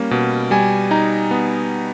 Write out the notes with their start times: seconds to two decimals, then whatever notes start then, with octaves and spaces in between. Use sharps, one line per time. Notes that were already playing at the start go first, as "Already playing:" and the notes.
Already playing: G3 A#3 C#4
0.11 B2
0.51 G3 G#5
0.91 D#4 A#5
1.31 B3